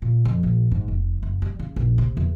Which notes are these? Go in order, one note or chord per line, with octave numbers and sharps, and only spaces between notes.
A#2
F2
A#1
G#2
F1
F#1
G3
C#3
A#1
C3
E2